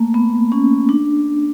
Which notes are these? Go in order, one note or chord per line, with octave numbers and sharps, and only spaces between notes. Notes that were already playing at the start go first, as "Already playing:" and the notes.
Already playing: A3 A#3
B3
C#4
D4